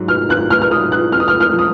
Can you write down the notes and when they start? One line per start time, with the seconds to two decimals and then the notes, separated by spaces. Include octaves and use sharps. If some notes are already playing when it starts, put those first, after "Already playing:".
Already playing: G#2 F#3
0.08 F6
0.29 G#1 F#6
0.50 F6
0.62 F6
0.71 G#2 F#3 D#6
0.92 F#6
1.12 F2 F6
1.20 D#6
1.28 F6
1.40 F6
1.54 F3
1.59 D#6